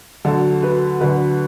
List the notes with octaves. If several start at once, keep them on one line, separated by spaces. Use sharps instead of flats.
D2 D3 F#3 A4
B4
D2 D3 F#3 B4